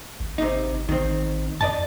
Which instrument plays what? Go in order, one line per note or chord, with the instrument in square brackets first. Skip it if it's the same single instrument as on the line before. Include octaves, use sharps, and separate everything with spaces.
[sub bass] G#1
[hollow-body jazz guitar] C3 D#4
[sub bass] A1 [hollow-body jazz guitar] D#3 C4
[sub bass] F#2 [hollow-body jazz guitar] D5 D#5 A5